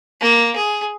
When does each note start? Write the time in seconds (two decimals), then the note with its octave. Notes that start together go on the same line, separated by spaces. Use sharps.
0.21 A#3
0.56 G#4